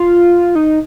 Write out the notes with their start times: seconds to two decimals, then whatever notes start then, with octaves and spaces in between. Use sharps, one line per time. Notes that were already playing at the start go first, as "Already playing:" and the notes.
Already playing: F4
0.55 D#4